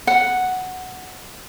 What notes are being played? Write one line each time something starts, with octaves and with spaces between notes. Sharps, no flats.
F#5